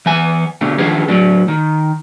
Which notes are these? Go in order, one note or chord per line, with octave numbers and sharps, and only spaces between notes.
E3 B3 G#5
D2 B2 D3 A3
D#3 F3 D4 G#4 B4
A2 F#3 D4
D#3